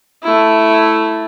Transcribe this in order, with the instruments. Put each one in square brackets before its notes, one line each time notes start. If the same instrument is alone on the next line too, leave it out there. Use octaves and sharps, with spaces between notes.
[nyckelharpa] A3 E4